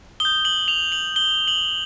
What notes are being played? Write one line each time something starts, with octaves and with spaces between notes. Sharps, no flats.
D#6 G6 G7
F#7
F7
F#7
G7
F#7